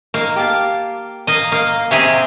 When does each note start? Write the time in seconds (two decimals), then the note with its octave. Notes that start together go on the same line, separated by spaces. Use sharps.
0.14 A#3 D#4
0.36 G4 F5 A5
1.27 A#3 D#5
1.52 A#3 D#5 F5
1.91 C3 G4 G#4 E5 G#5 A#5